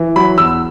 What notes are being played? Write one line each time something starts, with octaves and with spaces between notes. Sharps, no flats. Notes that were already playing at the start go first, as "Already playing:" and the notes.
Already playing: E3
F#3 B5
E2 E6